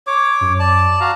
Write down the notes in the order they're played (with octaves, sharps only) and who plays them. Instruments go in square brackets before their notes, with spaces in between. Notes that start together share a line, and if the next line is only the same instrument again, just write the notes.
[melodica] C#5 D6
[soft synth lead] F#2
[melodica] D5 A5
F#4 F5 A#5